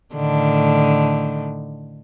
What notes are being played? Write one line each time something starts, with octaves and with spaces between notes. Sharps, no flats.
A2 D3 D#3